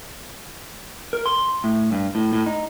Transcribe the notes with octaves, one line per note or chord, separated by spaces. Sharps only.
A#4
C6
A2
G2
A2
A2
D#4